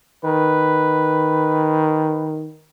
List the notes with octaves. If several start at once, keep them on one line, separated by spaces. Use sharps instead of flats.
D#3 B4